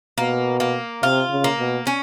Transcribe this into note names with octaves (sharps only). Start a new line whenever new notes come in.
B2 A#3
A#3
C3 F4
C#3
A#3
B2
C#4